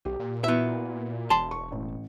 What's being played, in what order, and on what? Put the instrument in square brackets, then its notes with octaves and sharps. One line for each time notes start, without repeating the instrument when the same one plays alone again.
[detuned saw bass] B1 [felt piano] G4
[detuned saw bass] A#2
[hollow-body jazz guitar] B3 E5 [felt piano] E4 F#4
[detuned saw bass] E1 [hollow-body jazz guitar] A5 C6
[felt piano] C#6
A1